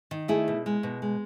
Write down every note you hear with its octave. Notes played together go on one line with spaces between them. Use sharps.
D#3
A3 E4 G#4
B2
G#3
B2
G#3